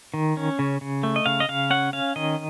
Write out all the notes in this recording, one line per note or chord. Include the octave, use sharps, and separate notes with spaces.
D#3
C#4
C#3
C#3
A3
D#5
C#3 F5
D#5
C#3 F5
C#4 F#5
C#4 F5
D#3 D#5